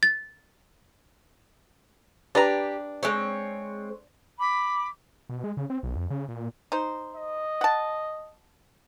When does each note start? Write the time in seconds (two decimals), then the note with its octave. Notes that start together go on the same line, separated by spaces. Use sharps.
0.03 A6
2.35 D4 G4 B4 A#5
3.03 G#3 C4 C#5
4.38 B5 D6
5.30 B2
5.44 G#3
5.57 C#3
5.70 C4
5.83 B1
5.96 F2
6.10 C#3
6.29 A#2
6.72 D#4 C5
7.16 D#5
7.61 F#5 A5